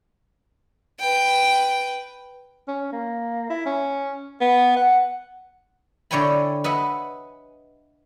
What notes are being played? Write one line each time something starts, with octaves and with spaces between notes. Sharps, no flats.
B4 G5
C#4
A#3
E4
C#4
B3
F#5
D3 E4 C#5 G5 G#5 B5
B4 D#5 E5 F#5 G#5